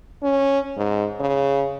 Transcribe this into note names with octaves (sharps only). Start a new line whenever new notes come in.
C#4
G#2
C#3